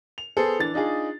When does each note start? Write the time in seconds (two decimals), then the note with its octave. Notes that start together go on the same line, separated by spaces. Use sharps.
0.18 F7
0.37 B3 G#4 A4 C5
0.59 E3 D4 A6
0.74 D4 D#4 F4 G#4